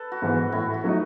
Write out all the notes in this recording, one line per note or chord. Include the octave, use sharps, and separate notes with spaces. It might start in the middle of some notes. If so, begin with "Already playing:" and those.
Already playing: A4 B4
F#4
G#2 E3 B3
A2 E4
F#4
F#3 A3 D#4